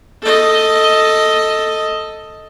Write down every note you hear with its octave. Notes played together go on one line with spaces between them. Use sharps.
A4 D#5